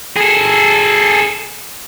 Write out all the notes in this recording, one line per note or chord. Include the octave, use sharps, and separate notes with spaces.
G#4 A4